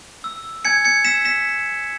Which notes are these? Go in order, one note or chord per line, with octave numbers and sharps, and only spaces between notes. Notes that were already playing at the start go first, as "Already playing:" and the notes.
E6
G#5 G#6 C#7
G#6 C#7
E6 B6 E7
B6 E7